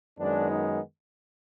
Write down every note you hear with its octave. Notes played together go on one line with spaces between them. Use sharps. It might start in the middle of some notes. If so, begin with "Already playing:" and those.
F#2 D#3 G#3 B3 D4
D#4